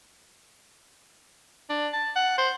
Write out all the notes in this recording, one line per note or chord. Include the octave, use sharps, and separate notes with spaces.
D4
A5
F#5
C5